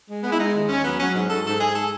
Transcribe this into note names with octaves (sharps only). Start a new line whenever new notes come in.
G#3
G#3 B3
E4
G#3 D#4
D#2
D#2 C#4
F#3 B3
F#3 C#4
G#2
G#2 A4
G#2 A4
G#2 G#4
A4